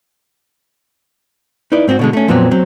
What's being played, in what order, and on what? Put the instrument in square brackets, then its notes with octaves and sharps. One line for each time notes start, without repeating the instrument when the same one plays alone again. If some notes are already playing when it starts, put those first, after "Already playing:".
[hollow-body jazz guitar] D#4 E4 B4 D5
G#2 C4 E4 F#4
B2 D3 G#3
A3 C#4
F2 A#2 F#3 B3 C4
F#3 C4